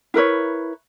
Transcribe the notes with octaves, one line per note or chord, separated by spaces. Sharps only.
E4 A#4 B4 C#5